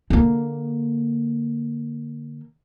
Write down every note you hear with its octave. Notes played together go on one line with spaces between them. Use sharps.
D3 A#3